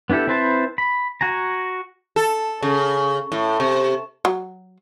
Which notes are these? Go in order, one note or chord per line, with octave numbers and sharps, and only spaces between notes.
B3 D4 E4 G4 A4
C4 E4 B4 C5 A5
B5
F#4 G#5 A#5
A4
C#3
A2
C3
F#3